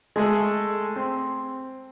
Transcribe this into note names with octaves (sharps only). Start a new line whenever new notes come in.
G#3 A3 G#4 A4
C4